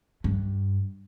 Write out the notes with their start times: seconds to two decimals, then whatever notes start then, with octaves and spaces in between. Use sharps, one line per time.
0.24 G2